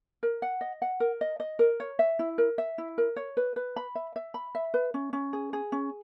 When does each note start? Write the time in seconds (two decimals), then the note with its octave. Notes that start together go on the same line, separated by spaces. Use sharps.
0.23 A#4
0.42 F#5
0.61 D#5
0.82 F#5
1.00 A#4
1.21 D#5
1.40 D#5
1.59 A#4
1.80 C#5
1.99 E5
2.19 E4
2.38 A#4
2.58 E5
2.78 E4
2.98 A#4
3.16 C#5
3.37 B4
3.56 B4
3.76 B5
3.95 E5
4.16 E5
4.34 B5
4.55 E5
4.74 B4
4.94 C#4
5.13 C#4
5.33 G#4
5.53 G#4
5.72 C#4